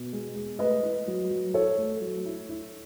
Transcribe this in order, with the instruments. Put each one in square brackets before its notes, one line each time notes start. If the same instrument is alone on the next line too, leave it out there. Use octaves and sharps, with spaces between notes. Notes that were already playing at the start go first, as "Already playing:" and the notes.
Already playing: [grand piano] B2
G#3
G#3
A3 B4 D#5
E4
F#3
F#3
E4 A4 C#5
A3
F#3
E4
E4